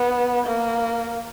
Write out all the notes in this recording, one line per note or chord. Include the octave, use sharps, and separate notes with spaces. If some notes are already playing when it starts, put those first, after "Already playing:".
Already playing: B3
A#3